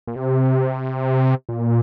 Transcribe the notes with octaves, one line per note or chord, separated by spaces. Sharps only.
A#2
C3
A#2